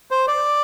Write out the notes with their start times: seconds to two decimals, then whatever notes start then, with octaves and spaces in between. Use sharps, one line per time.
0.11 C5
0.28 D5